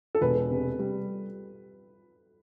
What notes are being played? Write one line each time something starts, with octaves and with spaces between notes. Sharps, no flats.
A4
E1 B4
C3
G3